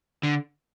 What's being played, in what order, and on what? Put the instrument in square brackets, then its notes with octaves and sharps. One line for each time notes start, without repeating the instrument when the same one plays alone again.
[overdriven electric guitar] D3